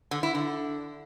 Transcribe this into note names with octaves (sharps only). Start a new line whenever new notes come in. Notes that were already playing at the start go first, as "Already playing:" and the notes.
D3
E4
D3